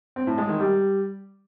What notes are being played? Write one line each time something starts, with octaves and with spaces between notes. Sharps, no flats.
C4
A2
G#3
D#3
G3